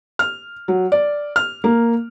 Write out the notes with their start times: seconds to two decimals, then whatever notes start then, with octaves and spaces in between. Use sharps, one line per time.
0.19 F6
0.68 F#3
0.92 D5
1.36 F6
1.64 A#3